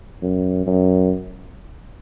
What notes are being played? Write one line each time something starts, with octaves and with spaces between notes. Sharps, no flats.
F#2
F#2